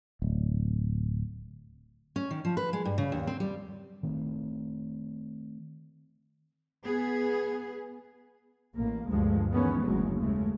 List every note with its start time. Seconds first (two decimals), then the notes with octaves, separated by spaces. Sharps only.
0.22 D1
2.16 C#4
2.31 D#3
2.45 F3
2.57 B4
2.73 G#3
2.85 G2
2.98 C#3
3.12 D#2
3.27 C4
3.40 G3
4.03 D#3 A3 C4
6.83 B3 G#4
8.75 A1 A#3
9.10 D2 G2 F3 G#3
9.50 D#3 E3 G#3 B3 C#4
9.85 F#1 D2 C#3 F#3 G#3
10.20 D#2 C#3 G#3 A3